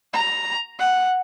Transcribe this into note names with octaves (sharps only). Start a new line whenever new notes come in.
A#5
F#5